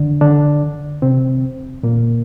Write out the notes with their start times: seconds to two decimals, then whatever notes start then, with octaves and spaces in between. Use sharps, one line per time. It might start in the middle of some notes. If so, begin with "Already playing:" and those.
Already playing: D3 D4
0.21 D3 D4
1.02 C3 C4
1.83 A#2 A#3